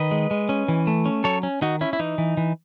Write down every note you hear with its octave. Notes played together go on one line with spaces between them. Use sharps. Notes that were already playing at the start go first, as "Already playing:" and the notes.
Already playing: D#3 B4 D#5
G#3
G#3
C#4
E3
A3
C#4
F#3 A4 C#5
C#4
D#3 D#4 F#4
C#4 E4
E4
E3 D#4
E3
E3